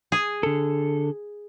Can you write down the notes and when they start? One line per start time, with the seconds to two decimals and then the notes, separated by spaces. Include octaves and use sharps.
0.12 G#4
0.43 D3 A4